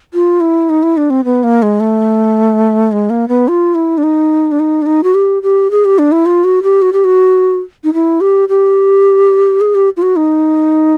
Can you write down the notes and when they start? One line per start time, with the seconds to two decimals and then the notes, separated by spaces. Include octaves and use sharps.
0.14 F4
0.41 E4
0.70 D#4
0.83 E4
0.97 D4
1.10 C4
1.25 B3
1.43 A#3
1.62 G#3
1.80 A3
2.92 G#3
3.10 A#3
3.28 B3
3.48 F4
3.75 E4
3.98 D4
4.03 D#4
4.52 D4
4.60 D#4
4.82 D4
4.86 D#4
5.04 F#4
5.14 G4
5.43 G4
5.71 G#4
5.85 G4
5.99 D4
6.12 E4
6.26 F4
6.44 F#4
6.63 G4
6.82 F#4
6.93 G4
7.04 F#4
7.84 D#4
7.94 E4
8.21 G4
8.49 G4
9.61 G#4
9.75 G4
9.97 F4
10.02 F#4
10.16 D#4